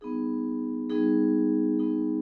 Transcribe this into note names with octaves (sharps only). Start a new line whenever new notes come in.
G3 B3 D#4 G#4
G3 B3 D#4 G#4
G3 B3 D#4 G#4